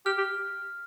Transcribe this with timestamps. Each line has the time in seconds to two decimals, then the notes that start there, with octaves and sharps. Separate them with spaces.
0.06 G4 F6
0.18 G4